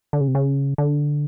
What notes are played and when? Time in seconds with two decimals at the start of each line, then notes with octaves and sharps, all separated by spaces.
0.13 D3
0.21 C#3
0.28 C3
0.35 C#3
0.78 D3